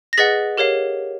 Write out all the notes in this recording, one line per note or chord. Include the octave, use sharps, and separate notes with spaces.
A#6
G#4 B4 D#5 F#5 A6 B6
G4 A#4 C#5 F5